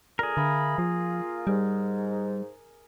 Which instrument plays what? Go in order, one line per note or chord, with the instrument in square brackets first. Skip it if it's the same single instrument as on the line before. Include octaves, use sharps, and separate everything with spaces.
[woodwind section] A#2 D3 [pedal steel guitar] G#4 A#4
[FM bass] D3 [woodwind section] E5 F5 B5
[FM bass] F3 [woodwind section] A#3 F4
[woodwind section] G#2 [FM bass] G3